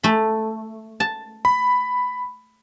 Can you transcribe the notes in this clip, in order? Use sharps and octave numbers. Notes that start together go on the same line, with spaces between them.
A3 B5
A5
B5